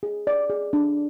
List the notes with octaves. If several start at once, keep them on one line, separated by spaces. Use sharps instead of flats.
G#4
D5
G#4
D4